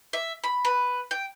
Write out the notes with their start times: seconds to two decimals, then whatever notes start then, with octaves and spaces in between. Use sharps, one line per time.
0.13 E5
0.44 B5
0.65 B4
1.11 G5